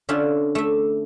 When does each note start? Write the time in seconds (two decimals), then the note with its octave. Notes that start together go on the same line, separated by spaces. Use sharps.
0.09 D3 C#4 D4 F4 E5
0.55 A3 E5